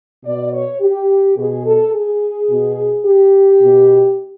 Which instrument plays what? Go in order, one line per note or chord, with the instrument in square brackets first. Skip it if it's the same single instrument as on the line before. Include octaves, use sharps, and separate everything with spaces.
[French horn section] B2 D5
C#5
G4
B2 G#4
A4
G#4
B2
G4
B2